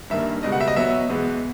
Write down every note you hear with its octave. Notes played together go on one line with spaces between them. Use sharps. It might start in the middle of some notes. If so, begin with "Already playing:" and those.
G2 D#3 G3 A#3 E5
C#2 B2 G3 D#5
F#5
E5
D#5
B2 F#3 B3 E5
E2 B2 G#3 B3